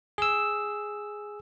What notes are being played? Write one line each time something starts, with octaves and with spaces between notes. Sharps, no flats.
G#4 E6